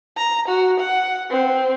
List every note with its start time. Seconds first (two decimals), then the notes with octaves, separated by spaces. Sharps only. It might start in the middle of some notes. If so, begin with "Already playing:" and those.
0.17 A#5
0.48 F#4
0.79 F#5
1.30 C4